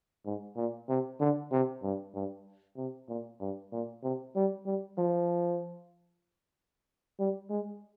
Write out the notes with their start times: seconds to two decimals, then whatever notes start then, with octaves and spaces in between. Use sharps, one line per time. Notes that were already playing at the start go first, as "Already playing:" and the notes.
0.25 G#2
0.56 A#2
0.89 C3
1.20 D3
1.52 C3
1.83 G2
2.15 G2
2.77 C3
3.09 A#2
3.40 G2
3.72 A#2
4.04 C3
4.36 G3
4.66 G3
4.98 F3
7.19 G3
7.50 G#3